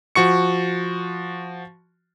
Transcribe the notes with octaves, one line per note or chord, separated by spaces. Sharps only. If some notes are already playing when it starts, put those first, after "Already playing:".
F3 F#4 C#6 C#7